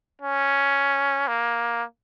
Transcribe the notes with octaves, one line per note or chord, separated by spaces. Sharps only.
C#4
A#3